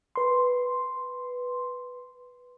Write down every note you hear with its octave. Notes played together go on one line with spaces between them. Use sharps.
B4 C6